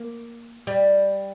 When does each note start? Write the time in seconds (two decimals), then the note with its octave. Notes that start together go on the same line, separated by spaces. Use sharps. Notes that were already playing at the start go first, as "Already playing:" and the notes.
Already playing: A#3
0.67 G3